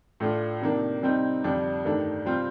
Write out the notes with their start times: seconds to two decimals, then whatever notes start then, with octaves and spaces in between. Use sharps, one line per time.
0.20 A2 A3 D4 F4
0.61 C3 D#3 A#3 D4
1.02 C3 G3 C4 D#4
1.44 F2 D3 G3 D4
1.85 G2 D#3 A3 D4
2.26 C3 G3 C4 F4